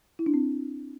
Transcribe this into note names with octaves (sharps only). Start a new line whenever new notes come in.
E4
D4
C4